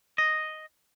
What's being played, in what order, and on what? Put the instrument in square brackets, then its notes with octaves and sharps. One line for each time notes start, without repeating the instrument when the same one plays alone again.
[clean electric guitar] D#5